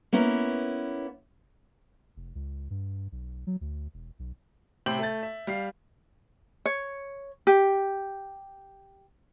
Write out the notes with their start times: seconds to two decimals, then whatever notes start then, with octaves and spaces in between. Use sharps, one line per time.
0.13 A#3 B3 C#4 E4
2.16 F1
2.35 C#2
2.70 G2
3.12 B1
3.47 F#3
3.61 D2
3.94 E1
4.19 B1
4.86 A2 C3 C5 G5 G6 F#7
4.99 A3 A6
5.23 E5
5.47 G3 F5 C7
6.65 C#5
7.47 G4